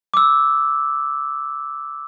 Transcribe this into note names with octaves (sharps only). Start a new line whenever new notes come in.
D6 E6